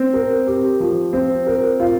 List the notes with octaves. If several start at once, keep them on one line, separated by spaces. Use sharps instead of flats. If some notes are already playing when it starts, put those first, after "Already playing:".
Already playing: C4
A#4
G4
F3
C4
A#4
F4